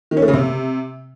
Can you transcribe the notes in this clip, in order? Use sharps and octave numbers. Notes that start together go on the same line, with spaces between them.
D#3
C#4
A3
C#3
C3